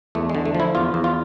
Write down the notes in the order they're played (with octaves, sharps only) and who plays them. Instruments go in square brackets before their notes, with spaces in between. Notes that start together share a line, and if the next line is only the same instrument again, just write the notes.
[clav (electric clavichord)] E2 A3
G#3
D3
A3
F3
E4
E2 F4
E2
F4